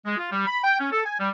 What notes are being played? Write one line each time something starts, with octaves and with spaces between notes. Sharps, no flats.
G#3
F4
G3
B5
G5
C#4
A4
G#5
G3